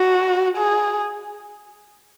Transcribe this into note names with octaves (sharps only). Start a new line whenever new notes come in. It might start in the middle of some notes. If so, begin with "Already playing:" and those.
Already playing: F#4
G#4